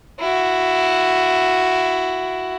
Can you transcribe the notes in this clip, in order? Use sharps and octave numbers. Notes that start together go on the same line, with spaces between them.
E4 F#4